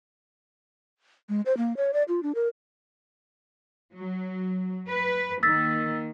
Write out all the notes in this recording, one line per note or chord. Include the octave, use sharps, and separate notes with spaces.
G#3
C5
A#3
C#5
D5
F4
D4
A#4
F#3
B4
D#3 A#3 E6 A6 B6